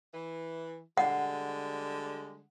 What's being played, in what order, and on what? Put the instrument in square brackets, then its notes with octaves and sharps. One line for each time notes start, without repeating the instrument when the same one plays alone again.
[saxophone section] E3
[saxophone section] D3 G3 G#3 [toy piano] F#5